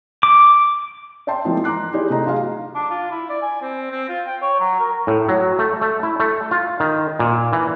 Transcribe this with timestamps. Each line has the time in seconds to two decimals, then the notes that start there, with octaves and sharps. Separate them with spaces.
0.23 D6
1.27 D5 E5 G5 A5 C6
1.45 E3 F3 G#3 A#3 C4 D#4
1.64 A#5 C6 D6 F#6 C7
1.93 D#4 E4 G4 G#4 D5 C6
2.10 C3 A3 D#4 D#5 A#5
2.26 F#3 F4 G#4 F5
2.75 D4
2.91 F4
3.11 E4
3.29 D5
3.42 G#5
3.61 C4
3.91 C4
4.09 F4
4.26 G5
4.42 C#5
4.59 F#3
4.80 A#4
5.07 A2
5.29 F#3
5.59 A3
5.81 A3
6.03 E4
6.20 A3
6.51 F4
6.80 D#3
7.19 A#2
7.53 E3